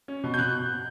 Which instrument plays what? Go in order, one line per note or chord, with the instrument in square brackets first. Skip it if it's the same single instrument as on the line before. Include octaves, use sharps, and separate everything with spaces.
[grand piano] C#4
B2
[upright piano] G6
[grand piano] B2 [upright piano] F#6